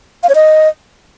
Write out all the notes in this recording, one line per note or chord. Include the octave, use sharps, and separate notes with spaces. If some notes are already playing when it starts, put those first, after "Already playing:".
F5
C#5
D#5